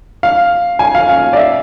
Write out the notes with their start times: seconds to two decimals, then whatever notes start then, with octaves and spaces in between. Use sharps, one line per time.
0.23 F5
0.79 G#5
0.95 F5
1.09 F5
1.33 D5
1.37 E5